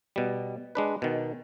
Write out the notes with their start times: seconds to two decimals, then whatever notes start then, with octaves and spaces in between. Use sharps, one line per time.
0.16 B2 G3
0.75 G#3 D4 B4
1.02 B2 D#3